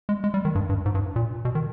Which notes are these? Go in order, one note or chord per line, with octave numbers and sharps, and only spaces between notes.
G#3
G#3
G3
D#3
G2
G2
G#2
G2
A#2
B2
D#3